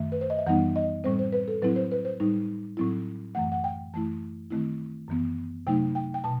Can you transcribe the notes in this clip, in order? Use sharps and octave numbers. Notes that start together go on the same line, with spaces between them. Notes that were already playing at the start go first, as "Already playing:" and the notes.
Already playing: F#2 D#3 A3 E5
B4
C5
D#5
E5
F#2 E3 G3 B3 D#4 F#5
D#5
A2 G3 C4 C5
C5
B4
A4
A2 F#3 C4 E4 B4
C5
B4
C5
A2 G3 D#4
A2 F#3 C4 E4
F#2 E3 A3 F#5
F#5
G5
F#2 E3 A3 E4 A5
D#3 A3 C4 E4
F#2 E3 B3
C3 F#3 A3 D#4 G5
G5
G5
B2 A5